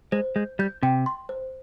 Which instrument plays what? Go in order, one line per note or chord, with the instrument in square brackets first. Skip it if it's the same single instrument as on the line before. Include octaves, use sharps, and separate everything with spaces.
[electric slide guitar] G#3 [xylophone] C5
[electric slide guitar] G#3 [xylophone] G6
[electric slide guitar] G3 [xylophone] G6
[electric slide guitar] C3 [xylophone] G5
[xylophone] C6
C5